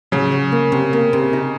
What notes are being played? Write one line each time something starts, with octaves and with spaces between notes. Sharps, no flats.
C#3 F#3
F#3
A#3
C3
A#3
C3
D#4